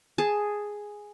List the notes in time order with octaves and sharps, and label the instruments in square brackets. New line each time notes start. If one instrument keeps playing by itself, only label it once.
[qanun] G#4 A5